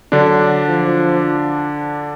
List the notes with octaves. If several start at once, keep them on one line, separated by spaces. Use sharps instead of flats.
D3 F#3 D4
F3